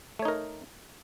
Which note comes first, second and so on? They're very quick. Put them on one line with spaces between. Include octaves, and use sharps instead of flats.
A3 C#5 D#4 A#4